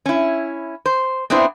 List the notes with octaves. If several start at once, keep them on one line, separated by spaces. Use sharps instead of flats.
C#4 E4
C5
B3 C4 D4 E4 C5